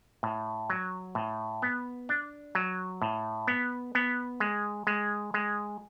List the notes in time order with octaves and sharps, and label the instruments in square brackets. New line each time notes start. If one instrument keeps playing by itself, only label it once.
[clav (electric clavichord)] A2
F#3
A2
B3
D4
F#3
A2
B3
B3
G#3
G#3
G#3